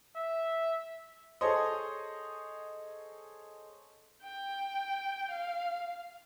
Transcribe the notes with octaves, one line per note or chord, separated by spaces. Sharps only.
E5
G#4 A4 C5 C#5 D#5
G5
F5